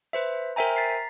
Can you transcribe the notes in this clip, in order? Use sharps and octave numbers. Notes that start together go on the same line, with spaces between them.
B4 C5 E5
A#4 C5 E5 G5 G#5 A#5
A#5 A6 B6 C7